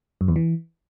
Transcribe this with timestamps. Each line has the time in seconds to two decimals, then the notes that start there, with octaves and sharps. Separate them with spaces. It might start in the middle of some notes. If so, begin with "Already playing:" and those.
0.21 F#2
0.28 E2
0.36 E3